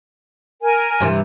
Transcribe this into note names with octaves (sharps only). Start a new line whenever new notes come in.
A#4 G#5
G2 C3 E3